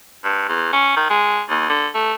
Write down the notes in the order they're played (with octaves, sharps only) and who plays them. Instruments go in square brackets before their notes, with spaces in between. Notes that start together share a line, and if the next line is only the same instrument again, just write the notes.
[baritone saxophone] G2
E2
C#4
D#3
G#3
D#2
D3
A3